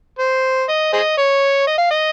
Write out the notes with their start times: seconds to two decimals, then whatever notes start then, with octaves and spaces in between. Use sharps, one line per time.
0.19 C5
0.69 D#5
0.93 G#4 C5 D#5
1.18 C#5
1.67 D#5
1.78 F5
1.91 D#5